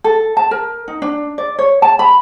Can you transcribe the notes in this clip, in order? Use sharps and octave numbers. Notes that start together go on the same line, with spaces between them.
A4
A5
A#4
D#4
D4
D5
C#5
A5
B5